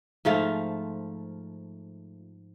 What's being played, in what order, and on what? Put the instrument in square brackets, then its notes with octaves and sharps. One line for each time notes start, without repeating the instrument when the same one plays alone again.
[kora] G#2 F3 A3 F4